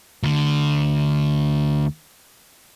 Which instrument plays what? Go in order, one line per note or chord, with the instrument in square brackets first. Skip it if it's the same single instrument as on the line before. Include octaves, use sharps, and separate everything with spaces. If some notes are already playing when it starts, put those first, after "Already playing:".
[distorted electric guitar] D2 D3